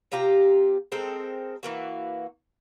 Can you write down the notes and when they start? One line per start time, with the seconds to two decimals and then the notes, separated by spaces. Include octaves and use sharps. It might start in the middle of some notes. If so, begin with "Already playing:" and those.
0.12 C3 F4 G4 A#5
0.92 G#3 C4 A4 A#4
1.63 E3 A#3 F#4